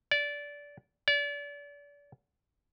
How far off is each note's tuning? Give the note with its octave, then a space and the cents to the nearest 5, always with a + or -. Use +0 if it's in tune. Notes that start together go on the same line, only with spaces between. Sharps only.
D5 -20
D5 -35